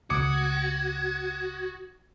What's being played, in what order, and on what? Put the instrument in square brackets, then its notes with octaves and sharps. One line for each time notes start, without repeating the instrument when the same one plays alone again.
[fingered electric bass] C#2 C#3 A3 [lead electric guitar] F#4 [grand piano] D6 D#6 C#7 [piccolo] G#6